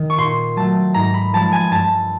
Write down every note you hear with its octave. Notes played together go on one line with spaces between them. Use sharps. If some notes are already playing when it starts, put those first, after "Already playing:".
Already playing: D#3
C#6
A#2 C6
F#3 A3 A5
G#2 A#5
B5
F3 G#3 A5
G#5
G2 A5